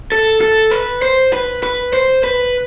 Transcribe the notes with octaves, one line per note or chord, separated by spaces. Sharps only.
A4
A4
B4
C5
B4
B4
C5
B4